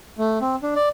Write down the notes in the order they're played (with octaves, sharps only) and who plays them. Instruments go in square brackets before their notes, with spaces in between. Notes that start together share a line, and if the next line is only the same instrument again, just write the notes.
[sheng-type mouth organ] A3
C4
D4
D5